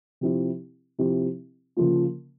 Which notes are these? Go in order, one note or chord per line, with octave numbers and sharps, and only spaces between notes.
C3 F3 C4 E4 G4
C3 F3 C4 E4 G4
C#3 F3 A#3 F4